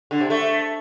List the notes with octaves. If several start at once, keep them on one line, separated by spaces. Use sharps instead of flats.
D3
C3
A3